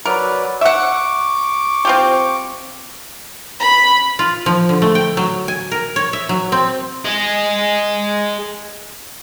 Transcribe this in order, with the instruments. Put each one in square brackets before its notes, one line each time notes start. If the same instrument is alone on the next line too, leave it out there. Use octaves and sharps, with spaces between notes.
[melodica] F#3 B4 D5 [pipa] A#4
[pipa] E5 F#5 [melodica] C#6 D6
[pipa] C4 F4 G4
[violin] B5
[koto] F4
F3
D3
A3
G5
F#3
G#5
A#4
C#5
E5
F#3
C4
[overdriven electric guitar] G#4 D#5